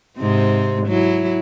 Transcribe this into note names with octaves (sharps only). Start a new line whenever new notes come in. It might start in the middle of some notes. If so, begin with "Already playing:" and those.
G#2 C3 C4
F#3 E4